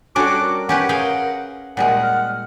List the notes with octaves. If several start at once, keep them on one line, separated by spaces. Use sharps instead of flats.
G3 C#4 D4 F#4 A4 D6 F#6
A#4
C#4 G4 B4 F#5
G#4 F5 G5
A#2 G3 G#3 A#4 F#5
F6